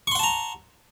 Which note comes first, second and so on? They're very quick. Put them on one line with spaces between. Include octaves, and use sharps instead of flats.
C#6 C6 F#5 A5 A#5